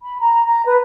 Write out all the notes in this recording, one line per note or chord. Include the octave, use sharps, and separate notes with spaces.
B5
A#5
A#5
B4